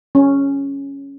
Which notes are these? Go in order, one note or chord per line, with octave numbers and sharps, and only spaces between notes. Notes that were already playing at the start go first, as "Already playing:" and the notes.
C#4